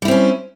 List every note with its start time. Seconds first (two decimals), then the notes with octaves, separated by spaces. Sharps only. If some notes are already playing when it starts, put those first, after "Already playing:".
0.02 G3
0.05 E4
0.08 C4
0.11 C#4